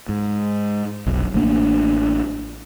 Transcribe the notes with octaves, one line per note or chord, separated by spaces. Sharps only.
G#2
F1 B1
A1 A3 A#3 D4